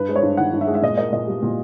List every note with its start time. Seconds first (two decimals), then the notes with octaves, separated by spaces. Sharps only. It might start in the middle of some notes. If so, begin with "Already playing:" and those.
Already playing: G2 B4
0.08 G#3 C5
0.16 C#5
0.23 G2
0.37 D#3 F#5
0.53 G2
0.61 E5
0.67 G#3
0.74 E5
0.82 A#2 D#5
0.97 A#3 D#5
1.12 A#2 D#5
1.28 G3
1.42 A#2